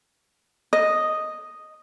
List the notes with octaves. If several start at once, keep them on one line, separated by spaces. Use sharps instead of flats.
D#5